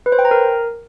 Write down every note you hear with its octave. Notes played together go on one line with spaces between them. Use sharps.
B4
C5
G5
A#5
A#4